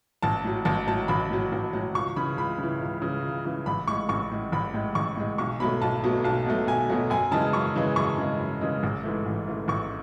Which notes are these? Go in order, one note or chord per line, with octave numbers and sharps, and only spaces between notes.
A1 A5
A2 F#3
A1 A5
A2 F#3 A5
A1 B5
A2 F#3
A1
A2 F#3
C#2 C#6
C#3 E3 B5
C#2 B5
C#3 E3
C#2
C#3 E3
C#2
C#3 E3
A1 B5
A2 G#3 C#6
A1 C#6
A2 G#3
A1 B5
A2 G#3
A1 C#6
A2 G#3
B1 C#6
B2 F#3 A3 B5
B1 A5
B2 F#3 A3
B1 A5
B2 F#3 A3
B1 G#5
B2 F#3 A3
F#2 G#5
C#3 E3 G#3 A5
F#2 C#6
C#3 E3 G#3
F#2 C#6
C#3 E3 G#3
F#2
C#3 E3 G#3
A1
G#2 E3 A3
A1
G#2 E3 A3
A1 C#6